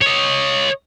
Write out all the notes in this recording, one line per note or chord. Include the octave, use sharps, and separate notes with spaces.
C#5 D#5